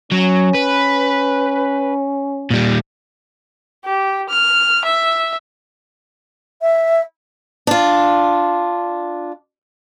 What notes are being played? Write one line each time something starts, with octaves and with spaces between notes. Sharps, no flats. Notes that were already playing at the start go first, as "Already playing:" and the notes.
F#3 C#4
B4
A#2 G3
G4
F6
E5
E5
D4 F4